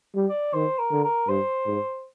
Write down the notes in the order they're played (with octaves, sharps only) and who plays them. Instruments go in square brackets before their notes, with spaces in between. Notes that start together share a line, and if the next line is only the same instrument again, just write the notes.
[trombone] G3
[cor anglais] D5
[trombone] D#3 [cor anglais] C5
[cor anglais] A#4
[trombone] D3
[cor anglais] A#4
[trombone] G2 [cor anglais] C5
[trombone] G#2